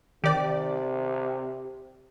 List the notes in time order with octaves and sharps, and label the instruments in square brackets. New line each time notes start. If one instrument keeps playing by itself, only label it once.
[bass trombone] C3 [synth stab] D#3 D5 [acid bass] G4